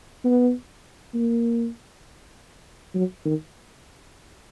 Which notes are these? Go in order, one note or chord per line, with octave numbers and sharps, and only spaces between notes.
B3
A#3
F#3
D#3